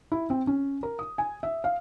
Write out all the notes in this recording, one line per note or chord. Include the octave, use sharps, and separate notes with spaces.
E4
C4
C#4
A#4
D#6
G#5
E5
F5